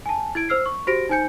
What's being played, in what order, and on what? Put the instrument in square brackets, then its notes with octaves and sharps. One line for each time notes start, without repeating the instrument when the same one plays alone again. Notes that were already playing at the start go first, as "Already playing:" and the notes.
[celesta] G#5 A5
E4 G#6 D7
C5 E6 F6 C7
C#6
F#4 G4 C5 A#6 D7
D#4 C5 G#5 G6 C#7